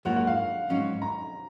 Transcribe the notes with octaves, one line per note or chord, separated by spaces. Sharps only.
G#2 F#3 A#3 F4 F#5
F#5
F5
G#2 F#3 C#4
A#5